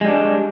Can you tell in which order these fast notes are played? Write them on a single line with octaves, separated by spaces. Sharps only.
G#3 G3 D4